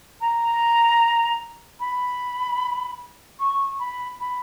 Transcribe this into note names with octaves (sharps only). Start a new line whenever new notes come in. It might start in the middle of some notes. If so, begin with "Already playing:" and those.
A#5
B5
C#6
B5
B5